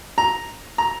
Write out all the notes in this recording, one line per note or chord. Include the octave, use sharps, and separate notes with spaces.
A#5
A#5